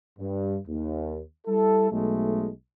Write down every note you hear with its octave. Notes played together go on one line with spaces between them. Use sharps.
G2
D#2
G3 E4 A4
B1 G#3 A3